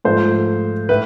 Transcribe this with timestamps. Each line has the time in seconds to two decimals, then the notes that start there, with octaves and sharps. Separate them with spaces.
0.05 G#2 F3 A3 C5
0.89 A2 B4